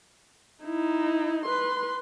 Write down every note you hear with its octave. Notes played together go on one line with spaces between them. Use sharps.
D#4 E4
B4 C6